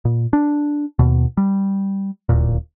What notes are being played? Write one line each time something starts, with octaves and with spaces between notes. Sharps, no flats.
A#2
D4
D#2 B2
G3
D1 D#2 A#2